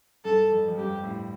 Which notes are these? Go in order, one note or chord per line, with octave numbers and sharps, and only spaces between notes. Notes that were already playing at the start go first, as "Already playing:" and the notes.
G2 A4
F2
F2
G2 G4
A2